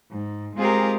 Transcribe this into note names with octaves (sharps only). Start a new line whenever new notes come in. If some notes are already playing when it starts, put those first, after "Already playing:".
G#2
G#3 C4 F4 G4 G#4 A#4